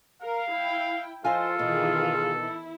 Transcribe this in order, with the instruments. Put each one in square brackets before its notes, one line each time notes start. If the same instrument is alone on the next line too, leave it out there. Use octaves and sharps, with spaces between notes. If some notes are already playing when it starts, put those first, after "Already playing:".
[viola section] A#4 [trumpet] F5
[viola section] E4 G5
[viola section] F3 C5 [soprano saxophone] F4 [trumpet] A4 [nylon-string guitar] D#5 F5 G#5
[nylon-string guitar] B2 [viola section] D#3 E3 G#4
[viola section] E4